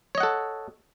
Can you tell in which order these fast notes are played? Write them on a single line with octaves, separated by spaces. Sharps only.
C#5 D#5 F#5 A4